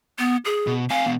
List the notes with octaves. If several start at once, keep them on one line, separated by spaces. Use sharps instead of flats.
B3
G#4
B2
C4 F5 G#5
E2 B2